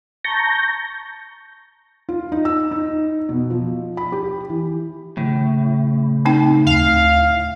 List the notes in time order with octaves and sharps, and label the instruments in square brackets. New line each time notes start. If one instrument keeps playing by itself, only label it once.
[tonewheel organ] A5 A#5 C#6 G6 A#6
[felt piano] F4
D#4
E6
D#4
B2
F3
B5
G4
E3
[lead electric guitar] A2 [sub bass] C#3
[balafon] C4 D#4 G5
[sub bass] D2 [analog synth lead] F5